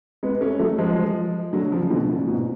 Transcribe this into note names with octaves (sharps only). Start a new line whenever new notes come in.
G#3 B3
A3 C#4
F#3 A3
F3 G#3
D3 F#3
C#3 F3
B2 D3
A2 C#3
G#2 B2